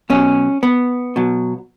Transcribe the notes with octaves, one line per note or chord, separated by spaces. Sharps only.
B2 F#3 C#4
B3
B2 F#3